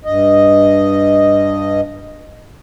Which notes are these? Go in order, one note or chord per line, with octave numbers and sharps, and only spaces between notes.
G2 D#5